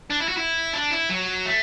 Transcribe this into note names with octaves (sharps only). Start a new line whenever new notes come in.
D4
E4
F#4
E4
D4
E4
F#3
A3